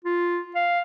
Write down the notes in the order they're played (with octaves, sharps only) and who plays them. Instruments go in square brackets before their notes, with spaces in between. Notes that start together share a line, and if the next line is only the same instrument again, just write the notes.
[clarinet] F4
F5